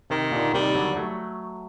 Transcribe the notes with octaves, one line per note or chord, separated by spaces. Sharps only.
C3 D#3
D#2 A#2 D3
C3 D#3 G3
D#2 D3 F#3
F#3 A3